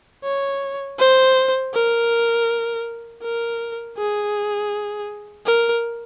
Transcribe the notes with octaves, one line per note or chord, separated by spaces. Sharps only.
C#5
C5
A#4
A#4
G#4
A#4